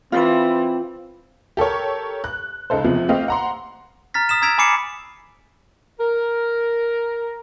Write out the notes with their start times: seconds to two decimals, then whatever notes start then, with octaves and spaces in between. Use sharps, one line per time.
0.12 E3 C4 F4
1.57 G4 A4 A#4 C#5
2.24 F#6
2.70 C#2 D#4 A4 C5
2.84 E2 C3 F3
3.09 A3 C4 G4 D#5 F5
3.28 F#5 A#5 C6
4.14 A#5 F6 A6 B6
4.29 D#6 B6 E7
4.42 A#5 E6 G#6 B6 D7 F7
4.58 G#5 B5 D6 C7 C#7 E7
5.99 A#4